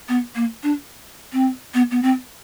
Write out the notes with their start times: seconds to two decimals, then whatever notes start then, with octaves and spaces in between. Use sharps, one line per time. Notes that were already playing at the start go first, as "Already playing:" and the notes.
0.09 B3
0.35 A#3
0.63 D4
1.33 C4
1.74 B3
1.91 B3
2.02 C4